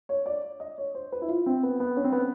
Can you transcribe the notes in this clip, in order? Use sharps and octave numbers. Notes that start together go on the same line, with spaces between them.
C#5
D5
D#5
C#5
C5
B4
E4
F4
C4
B3
B3
C#4
C4
B3